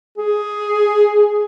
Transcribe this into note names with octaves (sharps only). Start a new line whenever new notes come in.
G#4